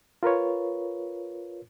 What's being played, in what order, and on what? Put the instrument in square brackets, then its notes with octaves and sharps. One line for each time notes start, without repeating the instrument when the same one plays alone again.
[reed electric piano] F4 A#4 B4 C#5